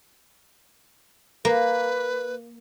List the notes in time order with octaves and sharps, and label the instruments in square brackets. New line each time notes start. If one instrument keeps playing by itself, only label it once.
[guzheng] A#3 [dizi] B4